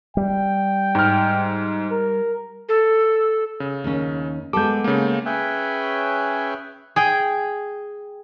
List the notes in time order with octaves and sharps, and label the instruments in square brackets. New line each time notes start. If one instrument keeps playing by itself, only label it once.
[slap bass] G3 [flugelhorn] G5
[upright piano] G#2 F6
[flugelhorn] A#4
[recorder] A4
[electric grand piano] C#3
[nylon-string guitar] D#2 C#4
[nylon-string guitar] G#3 B3 A4 [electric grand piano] D6 G6
[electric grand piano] C#3 A#3
[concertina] C#4 G#4 B4 C#5 E5 G5
[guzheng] G#4 G5